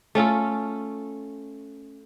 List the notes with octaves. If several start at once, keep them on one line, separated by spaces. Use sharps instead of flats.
A3 C#4 F4 A4